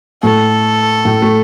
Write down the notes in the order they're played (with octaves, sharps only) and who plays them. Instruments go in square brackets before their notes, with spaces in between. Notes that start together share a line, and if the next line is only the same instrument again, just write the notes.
[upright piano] A2 A3 [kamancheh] A4
[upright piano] A2 A3
A3